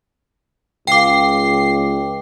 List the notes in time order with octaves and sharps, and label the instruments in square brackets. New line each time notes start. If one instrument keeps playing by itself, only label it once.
[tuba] C#2 [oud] G#3 F4 [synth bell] G5 D6 [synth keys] C7